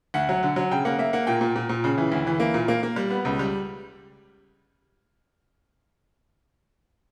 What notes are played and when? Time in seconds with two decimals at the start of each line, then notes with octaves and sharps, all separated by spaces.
0.14 D2 F#5
0.29 F#3
0.43 D3
0.56 F#3
0.71 C#3 G5
0.85 A#3 F#5
0.99 A#3 E5
1.13 A#3 F#5
1.27 A#2 G5
1.41 A#2
1.56 A#2
1.69 A#2
1.84 C#3
1.98 E3
2.12 D2
2.27 E3
2.40 A#3
2.54 A#2
2.68 A#3
2.83 A#3
2.96 G3
3.10 B3
3.25 C#2
3.39 G3